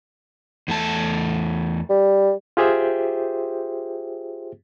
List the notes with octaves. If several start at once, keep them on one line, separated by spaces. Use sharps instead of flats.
E2 A3 A5
G3
F4 G4 G#4 C5 E5 G5